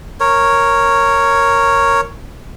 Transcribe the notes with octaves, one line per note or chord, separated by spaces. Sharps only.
A#4 C#5